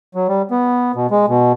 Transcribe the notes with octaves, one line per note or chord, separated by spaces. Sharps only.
F#3
G3
B3
B2
G#3
B2